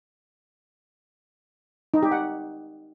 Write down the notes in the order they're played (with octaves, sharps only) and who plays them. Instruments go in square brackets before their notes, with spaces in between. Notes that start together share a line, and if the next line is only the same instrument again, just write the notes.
[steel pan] D#4
G4
F#5